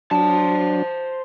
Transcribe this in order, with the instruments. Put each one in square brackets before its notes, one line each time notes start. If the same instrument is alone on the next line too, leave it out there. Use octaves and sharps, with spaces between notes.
[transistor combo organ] F#3 D4 [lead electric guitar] C5 A5